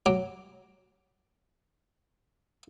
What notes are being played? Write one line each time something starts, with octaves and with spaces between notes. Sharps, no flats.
F#3 D6